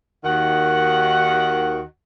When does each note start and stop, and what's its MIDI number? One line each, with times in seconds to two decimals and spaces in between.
0.24 1.83 39
0.24 1.83 51
0.24 1.83 66
0.24 1.83 78